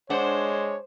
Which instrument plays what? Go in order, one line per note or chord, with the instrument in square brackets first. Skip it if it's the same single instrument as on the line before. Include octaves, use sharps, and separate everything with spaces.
[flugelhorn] G#3 [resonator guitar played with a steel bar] D4 F#5 [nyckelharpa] C5 [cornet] C#5